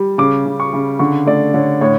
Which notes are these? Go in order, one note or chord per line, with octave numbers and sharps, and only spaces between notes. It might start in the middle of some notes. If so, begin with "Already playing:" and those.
Already playing: G3
C#3 D6
C#3
C#6
C#3
D3 C#6
A3 D5
D3 C#5
A2 C#5